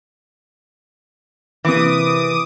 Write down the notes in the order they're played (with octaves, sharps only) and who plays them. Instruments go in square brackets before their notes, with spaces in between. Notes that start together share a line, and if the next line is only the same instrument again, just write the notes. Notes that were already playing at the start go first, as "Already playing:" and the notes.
[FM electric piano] C3 A#3 C5 [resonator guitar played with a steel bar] E3 [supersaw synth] D6 D#6